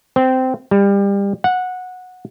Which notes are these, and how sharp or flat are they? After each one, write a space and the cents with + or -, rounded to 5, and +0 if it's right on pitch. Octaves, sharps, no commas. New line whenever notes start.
C4 -15
G3 +30
F#5 -15